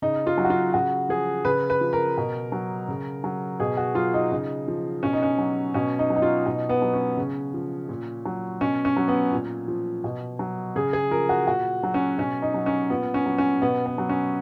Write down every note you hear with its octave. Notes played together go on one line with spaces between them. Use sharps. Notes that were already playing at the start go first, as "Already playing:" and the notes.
C#3 D#4
F4
F#3
F#4
F4
C#3 F#4
F3 G#4
C#3 B4
B4
F3
A#4
B2
F#3
C#3
F#3
B2 G#4
F#4
F#3 F4
D#4
C#3 D#4
F3
B2 C#4
D#4
C#4
F#3
B2 C#4
D#4
F#3
D#4
F4
B2 D#4
B3
F#3
C#4
C#3
F3
A#2
F#3
B2 C#4
C#4
F#3
B3
A#2
F3
B2
F#3
C#3 G#4
G#4
F3 A#4
F#4
A#2 F#4
F#3
C#4
B2 C#4
D#4
F#3
C#4
A#2 B3
C#4
F#3
C#4
B2 B3
B3
F#3
C#4